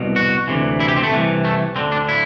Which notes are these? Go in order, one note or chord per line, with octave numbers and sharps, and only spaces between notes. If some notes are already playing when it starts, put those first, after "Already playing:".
Already playing: C2 B2
F#4
D2 C3 E3
E4
G4
C4
A3
C2 C3 E3
A3
D2 D3 C4
D4
E4